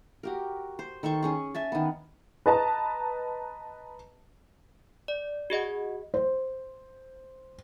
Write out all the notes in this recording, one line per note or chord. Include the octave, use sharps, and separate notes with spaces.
F#4 G4 A#4
C5
D#3 A4 C5 C#6
C#4 G#4 C#6
E5 G#5 A5
D#3 B3
B4 D#5 A5 A#5
D5
F#4 G#4 D#5 F#5
C5